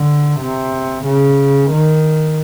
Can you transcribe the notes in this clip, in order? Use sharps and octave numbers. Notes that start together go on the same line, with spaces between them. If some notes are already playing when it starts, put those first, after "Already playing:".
Already playing: D3
C3
C#3
D#3